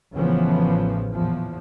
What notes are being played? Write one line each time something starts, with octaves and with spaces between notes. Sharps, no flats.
A1 C#3 E3 F3 B3
E2 A#2 F3